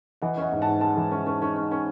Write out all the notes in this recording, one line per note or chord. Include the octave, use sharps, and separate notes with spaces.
E3 D#5 F#5
C#4 D#5 F#5
G#2
F#5 A5
G#2
G#3 F#5 A5
E3
C#4
C#4
C#4
C#4
C#4